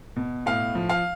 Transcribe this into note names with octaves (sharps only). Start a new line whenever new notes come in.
B2
A2 F5
F3
F5